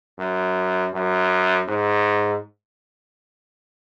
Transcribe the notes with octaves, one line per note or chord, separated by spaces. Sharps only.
F#2
F#2
G#2